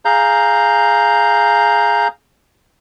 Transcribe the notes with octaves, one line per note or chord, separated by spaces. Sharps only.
G#4 F5 A#5 G6